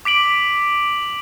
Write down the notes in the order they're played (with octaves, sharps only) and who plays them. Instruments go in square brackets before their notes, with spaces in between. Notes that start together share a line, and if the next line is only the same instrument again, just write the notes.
[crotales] D6 B6 D7 F#7